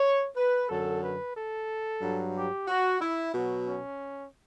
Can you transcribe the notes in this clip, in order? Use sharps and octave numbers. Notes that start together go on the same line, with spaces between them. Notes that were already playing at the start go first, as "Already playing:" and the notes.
Already playing: C#5
B4
F#2 D3 F#3 A4
B4
A4
G2 F#3
G4
F#4
E4
B2 F#3
C#4